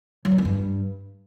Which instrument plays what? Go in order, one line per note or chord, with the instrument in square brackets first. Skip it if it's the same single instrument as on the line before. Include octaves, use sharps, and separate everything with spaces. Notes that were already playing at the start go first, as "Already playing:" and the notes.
[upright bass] F#3
G2
A#3
G2